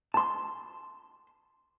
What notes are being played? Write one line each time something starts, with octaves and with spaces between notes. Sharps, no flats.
A5 C6